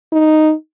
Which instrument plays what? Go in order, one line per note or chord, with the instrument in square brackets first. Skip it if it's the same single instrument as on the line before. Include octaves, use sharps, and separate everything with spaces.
[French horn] D#4